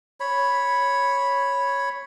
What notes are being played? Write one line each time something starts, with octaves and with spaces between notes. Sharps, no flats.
C#5 B5